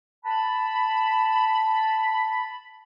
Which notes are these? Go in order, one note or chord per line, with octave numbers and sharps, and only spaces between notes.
A5 B5